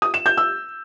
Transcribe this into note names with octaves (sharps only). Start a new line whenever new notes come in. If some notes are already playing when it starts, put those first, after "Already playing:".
D#6
E7
G6
E6